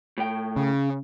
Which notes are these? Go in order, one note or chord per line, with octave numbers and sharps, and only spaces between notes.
A2 G5
C#3